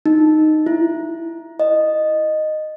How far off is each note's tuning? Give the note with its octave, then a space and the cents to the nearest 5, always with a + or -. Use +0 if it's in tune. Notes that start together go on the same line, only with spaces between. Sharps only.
D#4 -5
E4 +10
D#5 -10